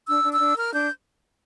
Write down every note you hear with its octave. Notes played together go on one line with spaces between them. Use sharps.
D4 E6
D4
E6
D4
A#4 F6
D4 G6